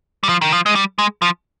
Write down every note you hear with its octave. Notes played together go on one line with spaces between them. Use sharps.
G3
F3
D#3
F3
G#3
G3
G#3
F3